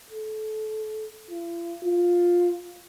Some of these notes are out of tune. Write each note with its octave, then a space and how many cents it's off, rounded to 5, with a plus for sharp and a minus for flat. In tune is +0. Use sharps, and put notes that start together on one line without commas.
A4 -25
F4 -45
F4 +10